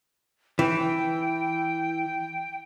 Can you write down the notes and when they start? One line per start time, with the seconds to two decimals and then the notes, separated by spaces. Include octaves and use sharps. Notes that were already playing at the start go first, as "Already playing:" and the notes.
0.59 E3 G5